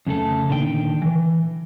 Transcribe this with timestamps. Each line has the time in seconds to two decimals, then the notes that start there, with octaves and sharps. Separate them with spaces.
0.07 F2 C#3 A3 A4
0.49 A#2 D3 D#3 G5
1.02 E3